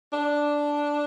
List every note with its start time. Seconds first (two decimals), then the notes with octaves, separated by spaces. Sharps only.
0.13 D4